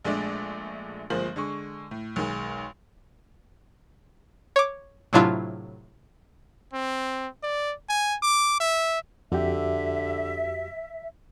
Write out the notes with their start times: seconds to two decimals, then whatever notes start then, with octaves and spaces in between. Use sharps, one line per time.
0.04 A#1 G#3 A3 D4 D5
1.10 G1 F3 G#3 A#3 C5 F#7
1.36 D3 G#3 C#6
1.91 A2
2.16 B1 D#3 G#3
4.56 C#5 D6
5.13 A2 C3 F#3 D4 E4 F4
6.73 C4
7.43 D5
7.89 G#5
8.22 D6
8.60 E5
9.32 F2 D3 F#4 G4 E5